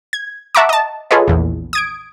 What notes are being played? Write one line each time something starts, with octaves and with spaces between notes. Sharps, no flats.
G#6
E5 F#5 A5 A#5 C#6 D6
D#5 A5
F4 G#4 A4 B4 C#5 D#5
A#1 E2
D#6 G#6 D7